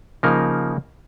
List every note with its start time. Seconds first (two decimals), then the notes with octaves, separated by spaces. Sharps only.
0.23 C#3 F3 A#3 D#4 A#4